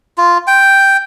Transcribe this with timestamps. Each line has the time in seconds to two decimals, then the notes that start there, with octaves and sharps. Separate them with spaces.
0.18 F4
0.47 G5